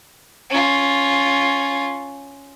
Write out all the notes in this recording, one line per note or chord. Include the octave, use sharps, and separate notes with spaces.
C#4 F4